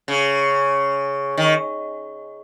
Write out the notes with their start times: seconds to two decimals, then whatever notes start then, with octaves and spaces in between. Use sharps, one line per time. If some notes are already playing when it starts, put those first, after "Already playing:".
0.08 C#3
1.37 D#3